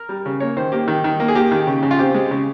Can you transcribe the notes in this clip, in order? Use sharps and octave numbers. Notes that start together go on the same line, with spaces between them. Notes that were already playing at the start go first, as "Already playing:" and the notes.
Already playing: A#4
G3
C#3
A#3 C#5
D#3 C5
A#3 G4
D#3
D#3
A#3
G#4
A#3 G4
D#3
C#3
C#3
F4
C4 G4
G#3
C#3